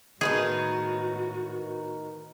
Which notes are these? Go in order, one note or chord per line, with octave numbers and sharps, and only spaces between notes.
A2 D#3 B3 D#4 F#4 G#4